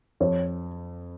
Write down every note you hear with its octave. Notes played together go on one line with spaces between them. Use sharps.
F2 C#5